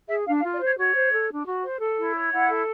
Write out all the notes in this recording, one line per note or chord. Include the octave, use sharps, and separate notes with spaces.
G#4 E5
D4 F5
F5
F4
D5
C5 C#5
F#4 C#5
C5
A4
D4
F#4
C5
A4
E4
C#5
E4 F#5
A4